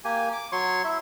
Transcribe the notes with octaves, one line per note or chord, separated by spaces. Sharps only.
A#3 G4 G#5
D6
F#3 C#5 C6 C#6
E4 E5